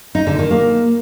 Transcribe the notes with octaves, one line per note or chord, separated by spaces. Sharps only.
D#4
D3
D#3
A#3